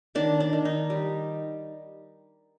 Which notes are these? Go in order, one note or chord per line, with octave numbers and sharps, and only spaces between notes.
D#3 D4
D4
D#3
D#4
G3